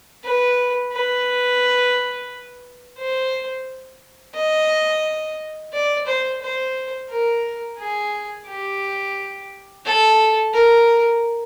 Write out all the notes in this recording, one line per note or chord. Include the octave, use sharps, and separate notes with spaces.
B4
B4
C5
D#5
D5
C5
C5
A#4
G#4
G4
A4
A#4